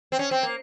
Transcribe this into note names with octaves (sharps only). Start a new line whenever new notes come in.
C4
C#4
C4
A#3